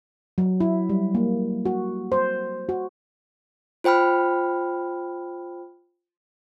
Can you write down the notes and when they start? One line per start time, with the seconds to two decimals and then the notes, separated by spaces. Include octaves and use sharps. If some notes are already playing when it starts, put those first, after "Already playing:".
0.38 F#3
0.60 E4
0.89 G3
1.15 A#3
1.65 F#4
2.12 C5
2.69 F#4
3.84 F4 C5 G5 B5 F6